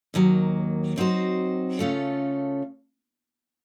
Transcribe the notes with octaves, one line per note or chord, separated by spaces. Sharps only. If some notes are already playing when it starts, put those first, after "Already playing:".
D#2 D#3 F#3 A#3
F#3 C4 D#4 F#4 C5
C#3 A3 C#4 F4 A4